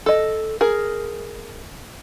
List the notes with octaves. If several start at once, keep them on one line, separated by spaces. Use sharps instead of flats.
A4 D#5
G#4 A#4